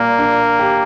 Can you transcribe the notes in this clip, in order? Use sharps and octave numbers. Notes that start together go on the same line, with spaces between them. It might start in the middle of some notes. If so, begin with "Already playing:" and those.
Already playing: A#2 G3 A#3
D4
G4